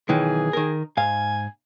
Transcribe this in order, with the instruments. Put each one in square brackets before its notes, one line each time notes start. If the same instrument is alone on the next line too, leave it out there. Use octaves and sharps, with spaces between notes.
[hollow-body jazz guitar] B1 D#3 E3 [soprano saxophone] G#4
[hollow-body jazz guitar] D#3 A#4
[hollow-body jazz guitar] G#2 F5 [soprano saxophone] G#5